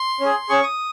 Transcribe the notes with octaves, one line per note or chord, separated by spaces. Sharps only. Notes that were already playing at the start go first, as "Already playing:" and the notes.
Already playing: C6
C#4 G#4
C#4 G#4 C#6
D#6